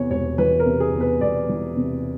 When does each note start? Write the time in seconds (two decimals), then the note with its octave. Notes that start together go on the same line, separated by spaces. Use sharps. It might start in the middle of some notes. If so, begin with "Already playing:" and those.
Already playing: E2 C3 C#5
0.11 E1 C#5
0.38 E3 B4
0.59 A#4
0.66 C3
0.80 G#4
0.93 E2
1.00 B4
1.21 E1 D5
1.49 E3
1.77 C3